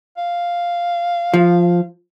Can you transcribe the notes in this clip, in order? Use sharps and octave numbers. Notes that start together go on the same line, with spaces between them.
F5
F3